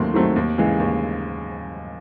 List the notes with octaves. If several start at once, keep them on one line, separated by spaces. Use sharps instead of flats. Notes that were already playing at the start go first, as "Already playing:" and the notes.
Already playing: D#2 D#3 F#3 A3 C4 C6
D#3 F#3 A3 C4
D#2
C#3 E3 G#3
D#2